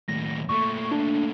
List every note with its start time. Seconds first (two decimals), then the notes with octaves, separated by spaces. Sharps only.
0.08 D#2 A2 A#6
0.49 A#2 A3 C#6
0.91 D4